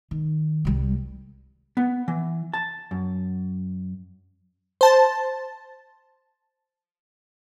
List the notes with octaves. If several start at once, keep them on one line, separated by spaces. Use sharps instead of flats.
D#3
C2 G3
B3
E3
A5
F#2
C5 A5